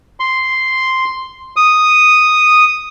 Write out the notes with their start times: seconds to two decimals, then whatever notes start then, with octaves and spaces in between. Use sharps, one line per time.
0.20 C6
1.56 D#6